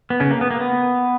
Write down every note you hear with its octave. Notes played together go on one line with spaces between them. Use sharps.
B3
C#3 C#4
A#3
B3
A#3
B3